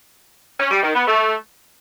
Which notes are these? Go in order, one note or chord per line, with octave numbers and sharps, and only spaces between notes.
C#4
G3
D#3
B3
A3